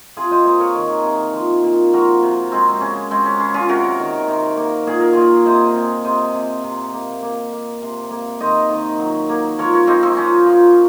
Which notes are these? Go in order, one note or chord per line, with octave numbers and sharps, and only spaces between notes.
C3 F4 G#4
C5 D#5
A#3 C5 D#5
A#4 C#5
D#3
C3
F3
A#2
F3 F#4 A#4
C3
G#3 C4
C4
C#3 C#4
G#3 C4
C#4
C#3
C#4 F4
C3 F#4 A#4
D#3
C3
A#3
A#2 G#4
A#4
A#2 F4 G#4
C3 C5 D#5
C3
C3 C5 D#5
C3
C3
A#3
A#3
A#3
C3
A#3
D#3 C5 D#5
D#3
F#3
A#3
F3 A#4 C#5
A#4 C#5
A#3 C4 D#4
C4 D#4
F3 C#4
F3